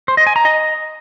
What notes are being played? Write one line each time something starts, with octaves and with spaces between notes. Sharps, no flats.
C5
D#5
G#5
A#5
D#5